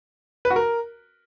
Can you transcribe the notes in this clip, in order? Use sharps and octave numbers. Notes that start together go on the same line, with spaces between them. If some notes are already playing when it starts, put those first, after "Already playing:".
B4
F#4
A#4